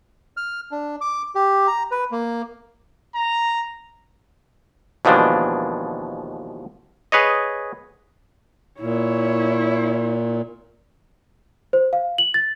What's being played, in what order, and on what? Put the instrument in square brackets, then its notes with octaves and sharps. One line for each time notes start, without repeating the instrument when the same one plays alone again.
[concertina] F6
D4
D6
G4
A#5
B4
A#3
[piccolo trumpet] A#5
[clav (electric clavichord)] D#2 B2 E3 F3 G#3 D4
G#4 B4 C#5 D#5
[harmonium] A#2 [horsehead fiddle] E4 C#5
[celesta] C5
F5
F#7
A6